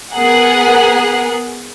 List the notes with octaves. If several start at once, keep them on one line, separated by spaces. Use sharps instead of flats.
B3 G#4 A#4 F#5